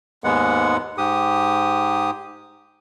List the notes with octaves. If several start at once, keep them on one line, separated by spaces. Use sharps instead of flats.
D#2 G#2 G#3 B3 F#5
G#2 G4 D#6